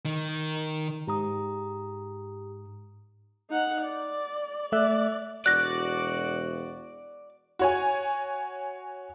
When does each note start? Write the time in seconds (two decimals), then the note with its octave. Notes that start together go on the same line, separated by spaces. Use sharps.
0.05 D#3
1.07 G#2 G4 A#5 D#6
3.50 D#4 F#5
3.82 D5
4.72 A3 D5 E5 F#6
5.46 E1 F#4 D5 F#6 A#6
7.59 F#4 C#5 G#5